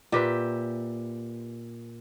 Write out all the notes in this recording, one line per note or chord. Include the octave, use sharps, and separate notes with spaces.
A#2 G4 B4 E5